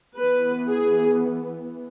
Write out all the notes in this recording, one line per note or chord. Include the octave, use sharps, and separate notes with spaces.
E3 B3 B4
G#4